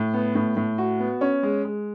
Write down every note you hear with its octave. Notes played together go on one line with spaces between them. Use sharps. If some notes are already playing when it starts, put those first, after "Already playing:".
Already playing: A2
B3
A2
A2
F#4
B3
C#4
G#3
G#3